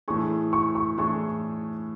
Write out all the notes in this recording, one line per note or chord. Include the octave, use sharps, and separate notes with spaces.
A2 E3 A3 D4 G#4 C#6
C#6
C#6
A2 E3 A3 D4 G#4 C#6